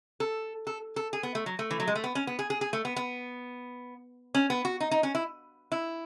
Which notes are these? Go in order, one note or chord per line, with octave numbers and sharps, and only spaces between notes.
A4
A4
A4
G#4
B3
A3
F#3
A3
E3
F#3
G#3
A3
B3
C#4
B3
G#4
G#4
G#4
A3
B3
B3
C#4
B3
F#4
D#4
D#4
C#4
E4
E4